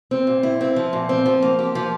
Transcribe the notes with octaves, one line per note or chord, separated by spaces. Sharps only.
C4
A#2
E4
C4
F3
A#2
C4
F3
A#3
G4
F3